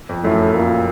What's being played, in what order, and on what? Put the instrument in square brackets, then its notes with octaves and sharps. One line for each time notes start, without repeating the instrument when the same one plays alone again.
[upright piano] F2
[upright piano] F#2 [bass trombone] A2
[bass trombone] A#2